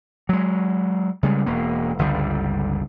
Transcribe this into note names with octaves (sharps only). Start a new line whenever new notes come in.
F#3 G#3
C#3 G3 G#3
E1 A#3
G1 C#2 D3 G3